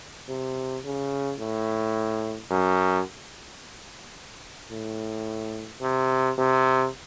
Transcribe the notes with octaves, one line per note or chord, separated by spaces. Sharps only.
C3
C#3
A2
F#2
A2
C3
C3